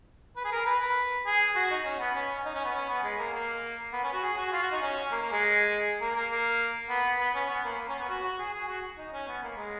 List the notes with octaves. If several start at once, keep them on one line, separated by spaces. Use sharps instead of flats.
B4
G#4
A#4
B4
G#4
F#4
D#4
C#4
B3
C#4
D#4
C#4
B3
C#4
B3
G#3
A#3
A#3
B3
C#4
F#4
G#4
F#4
F4
F#4
D#4
C#4
A#3
A#3
G#3
A#3
A#3
A#3
B3
B3
C#4
B3
A#3
A#3
C#4
B3
F#4
F#4
G#4
G#4
F#4
D#4
C#4
B3
A#3
G#3